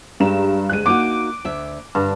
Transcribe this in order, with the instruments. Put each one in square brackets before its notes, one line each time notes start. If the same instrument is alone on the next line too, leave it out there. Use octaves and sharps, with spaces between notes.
[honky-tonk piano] G2 A#5 E7 [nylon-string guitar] G#3 G4
[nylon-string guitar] D2 G#3 [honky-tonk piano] F#6 D#7
[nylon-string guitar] A#3 D#4 F#4 [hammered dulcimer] D6
[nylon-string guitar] D2 E5
[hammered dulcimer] G2 [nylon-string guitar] D3